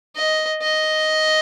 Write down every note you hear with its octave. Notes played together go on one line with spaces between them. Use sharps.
D#5
D#5